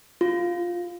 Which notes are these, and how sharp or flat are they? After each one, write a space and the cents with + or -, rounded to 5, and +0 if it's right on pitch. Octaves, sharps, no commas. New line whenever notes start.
F4 +5